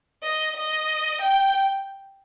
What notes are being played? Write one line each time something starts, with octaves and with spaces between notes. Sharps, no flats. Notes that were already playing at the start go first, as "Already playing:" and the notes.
D#5
D#5
G5